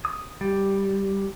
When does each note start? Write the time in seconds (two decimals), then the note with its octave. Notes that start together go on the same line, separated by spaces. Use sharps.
0.05 D#6
0.41 G3